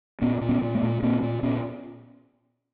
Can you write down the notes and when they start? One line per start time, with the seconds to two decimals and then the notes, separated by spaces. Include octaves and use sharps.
0.21 A#2 B3 C#4
0.41 A#2
0.49 B3 C#4
0.62 A#2
0.75 A3 B3
0.83 A#2
1.02 A#2 A#3 C4
1.22 A#2
1.43 A#2 B3 C#4